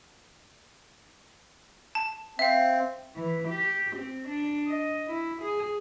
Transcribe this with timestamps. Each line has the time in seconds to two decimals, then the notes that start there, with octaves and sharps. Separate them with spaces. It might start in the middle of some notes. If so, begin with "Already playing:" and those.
1.95 A5
2.39 C4 E5 F5
3.16 E3
3.48 G4
3.96 C4
4.28 D4
4.68 D#5
5.11 E4
5.42 G#4